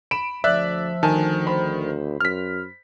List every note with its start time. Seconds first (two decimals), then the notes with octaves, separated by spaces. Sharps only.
0.11 B5 D7 E7
0.44 D2 F3 D5 E5 F#6
1.03 D2 D#3 G#5 A5
1.46 C5 B5
2.21 F#2 F6 B6